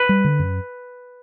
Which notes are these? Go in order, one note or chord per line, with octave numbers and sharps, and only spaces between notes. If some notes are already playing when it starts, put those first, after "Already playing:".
Already playing: B4
G3
D3
F#2